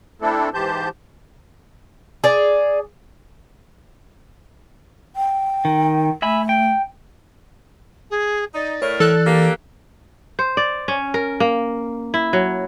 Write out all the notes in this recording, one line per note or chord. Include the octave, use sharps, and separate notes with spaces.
A3 C4 D4 E4 A4
G#2 E3 G4 C5 A5 G6
G#4 D5
G5
D#3
A3 E5 G#5 B5
G5
G#4
D#4 D5
A2 A#4 C#5
E3 A4 F#6
A#3 G4
C5
D5
C#4
A#4
A#3
E4
F#3